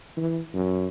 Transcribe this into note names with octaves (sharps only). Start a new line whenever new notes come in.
E3
F#2